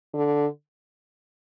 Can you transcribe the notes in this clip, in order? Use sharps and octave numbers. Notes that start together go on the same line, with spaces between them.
D3